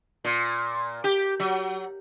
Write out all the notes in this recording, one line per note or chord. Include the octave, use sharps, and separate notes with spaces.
A#2
G4
F#3